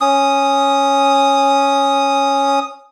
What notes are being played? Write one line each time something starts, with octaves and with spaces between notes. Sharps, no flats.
C#4 D#6